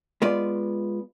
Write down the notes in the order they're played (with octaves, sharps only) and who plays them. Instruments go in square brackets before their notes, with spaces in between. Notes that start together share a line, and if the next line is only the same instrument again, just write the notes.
[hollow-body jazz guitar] G#3 B3 F4 B4 D5